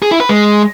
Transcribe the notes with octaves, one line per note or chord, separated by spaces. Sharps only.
G#4
E4
B4
G#3